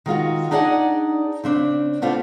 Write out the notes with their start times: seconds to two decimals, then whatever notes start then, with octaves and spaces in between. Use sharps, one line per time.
0.06 D#3 G#3 F4 F#4
0.51 D4 D#4 G#4 D5 F5 F#5
1.44 C#3 C4 D4
2.02 A3 B3 C4 D4 F4